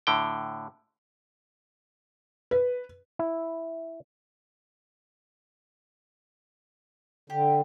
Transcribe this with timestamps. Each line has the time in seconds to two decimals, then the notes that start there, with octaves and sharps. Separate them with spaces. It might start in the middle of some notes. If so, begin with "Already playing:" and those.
0.07 A2 D3 G5
2.51 B4
3.19 E4
7.30 D3 G4